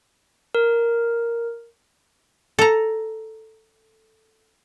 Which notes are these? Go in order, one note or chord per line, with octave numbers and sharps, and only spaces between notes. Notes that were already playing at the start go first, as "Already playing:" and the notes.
A#4
A4 A#5